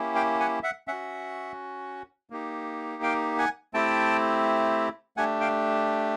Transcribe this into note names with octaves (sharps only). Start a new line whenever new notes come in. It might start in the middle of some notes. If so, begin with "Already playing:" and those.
Already playing: A#3 C#4 E4 G4
F5 G5
F#5 G#5
E5 F#5
C#4 F#4 E5 F#5
A#3 D#4 G4
F5 G5
F#5 G#5
A3 C4 E4 G4 G5 A5
A3 D4 G4 F#5 G#5
F5 G5